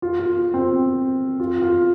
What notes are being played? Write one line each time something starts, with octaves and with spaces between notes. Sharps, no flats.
F4
F4
C4
F4
F4